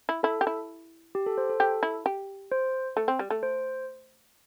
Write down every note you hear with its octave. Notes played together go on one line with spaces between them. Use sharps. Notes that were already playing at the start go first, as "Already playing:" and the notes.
E4
E4 A4
G4
E4
G4
A4
C5
A4
G4 A4
E4
G4
C5
A3
C4
G3
A3
C5